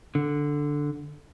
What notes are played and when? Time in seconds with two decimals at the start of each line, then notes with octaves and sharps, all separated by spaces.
0.15 D3